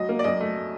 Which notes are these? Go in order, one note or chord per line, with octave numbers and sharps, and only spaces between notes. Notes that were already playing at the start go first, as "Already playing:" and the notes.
Already playing: D2 F#3 D#5
A#3
D5
F#2 D#5
A3